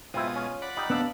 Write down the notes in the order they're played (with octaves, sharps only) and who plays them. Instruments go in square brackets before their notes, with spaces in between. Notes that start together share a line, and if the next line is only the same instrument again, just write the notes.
[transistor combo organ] B2 G#3 D#6 [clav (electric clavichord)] C4 E4 [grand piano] F4
[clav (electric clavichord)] C#4
[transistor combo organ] D5 F#5 B5
[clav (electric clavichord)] G3 D#4
[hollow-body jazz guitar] B3 D4 [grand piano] F5 E6 F#6